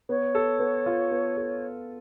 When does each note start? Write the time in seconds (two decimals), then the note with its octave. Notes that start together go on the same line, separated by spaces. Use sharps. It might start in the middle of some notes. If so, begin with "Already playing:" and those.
0.09 B3 C#5
0.35 A4
0.60 B3
0.86 F4
1.11 B3
1.37 A4